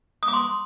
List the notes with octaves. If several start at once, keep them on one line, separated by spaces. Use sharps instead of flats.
D#6
D6
C6